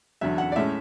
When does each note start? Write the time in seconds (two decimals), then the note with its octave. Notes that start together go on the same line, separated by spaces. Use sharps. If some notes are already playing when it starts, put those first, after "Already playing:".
0.21 E2 D3 F#3 E5
0.38 F#5
0.52 D5
0.56 A2 G#3 C#4 E5